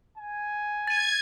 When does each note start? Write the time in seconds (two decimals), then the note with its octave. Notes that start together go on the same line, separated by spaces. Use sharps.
0.18 G#5
0.87 G#6 A6 D#7